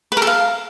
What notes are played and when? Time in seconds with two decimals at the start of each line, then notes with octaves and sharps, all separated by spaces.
0.12 B4
0.17 A#4
0.22 A4
0.27 F5